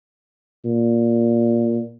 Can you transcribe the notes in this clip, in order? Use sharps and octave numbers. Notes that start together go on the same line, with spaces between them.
A#2